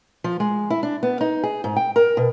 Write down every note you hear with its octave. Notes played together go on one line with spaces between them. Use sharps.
F3
G#3
E4
D4
B3
D#4
G#4
G#2
G5
A#4
B2